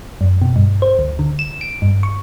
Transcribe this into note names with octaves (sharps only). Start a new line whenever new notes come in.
F#2
B2
G2
C5
D2
D3
E7
D7
G2
C#6